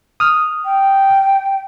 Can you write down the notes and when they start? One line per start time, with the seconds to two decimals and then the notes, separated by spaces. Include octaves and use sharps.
0.20 D#6 F6
0.65 G5